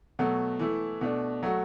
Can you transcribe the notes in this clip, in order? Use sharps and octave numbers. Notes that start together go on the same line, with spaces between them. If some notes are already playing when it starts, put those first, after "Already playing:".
B2 F#3 A3
E3 A3 E4
B2 A3 D4
F#3 A3 F#4